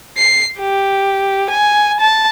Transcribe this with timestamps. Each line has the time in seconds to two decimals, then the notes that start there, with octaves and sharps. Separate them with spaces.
0.17 C7
0.60 G4
1.50 G#5
2.00 A5